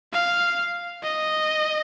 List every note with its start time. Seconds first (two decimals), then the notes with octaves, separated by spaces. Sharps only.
0.13 F5
1.04 D#5